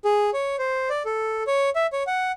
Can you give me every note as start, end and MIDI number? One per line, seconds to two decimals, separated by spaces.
0.05 0.30 68
0.34 0.56 73
0.58 0.89 72
0.89 1.03 74
1.05 1.43 69
1.47 1.70 73
1.75 1.87 76
1.93 2.03 73
2.07 2.32 78